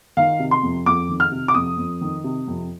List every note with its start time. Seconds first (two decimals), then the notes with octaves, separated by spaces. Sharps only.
0.17 D#3 F5
0.39 C3
0.51 C6
0.63 F2
0.86 F2 D6
1.09 D#3
1.20 F6
1.32 C3
1.48 D6
1.54 F2 D#6
1.78 F2
2.01 D#3
2.24 C3
2.47 F2